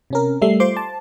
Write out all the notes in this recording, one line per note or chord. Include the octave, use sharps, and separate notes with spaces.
C3 C#4 A#4
G3 A3 E5 C7
F4 C5 C6 D6
A5